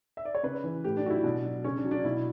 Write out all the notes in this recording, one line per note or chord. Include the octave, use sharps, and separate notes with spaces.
E5
D5
C#5
C#3 B4
E3
A2 G4
D4
F#3 F#4
E4
B2 D4
F#3
C#3 C#4
D4
F#3
D4
B2 E4